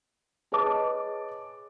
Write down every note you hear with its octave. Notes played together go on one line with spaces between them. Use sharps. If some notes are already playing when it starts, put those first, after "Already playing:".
G#4 B4 C#5 D#5 A5 D6